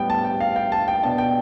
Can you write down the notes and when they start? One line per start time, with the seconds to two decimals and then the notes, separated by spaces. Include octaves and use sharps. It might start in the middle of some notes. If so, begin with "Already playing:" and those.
Already playing: A2 G3 B3 G5
0.10 A5
0.25 G5
0.40 F5
0.56 G5
0.72 A5
0.88 G5
1.03 B2 B3 D4 A5
1.18 G5